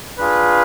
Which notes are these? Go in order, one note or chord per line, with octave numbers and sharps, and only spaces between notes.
D4 F4 G#4 B4